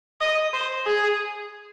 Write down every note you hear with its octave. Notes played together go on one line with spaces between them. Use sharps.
D#5
C5
G#4